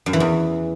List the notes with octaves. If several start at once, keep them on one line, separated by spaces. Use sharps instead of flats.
F#2
E3
E2